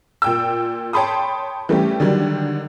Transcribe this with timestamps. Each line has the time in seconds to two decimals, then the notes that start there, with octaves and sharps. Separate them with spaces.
0.22 A#2 G5 E6
0.93 C#5 G5 A5 B5 C6 D#6
1.69 E3 G3 A3 C#4 G4
2.00 D3 D#3 F#3 G3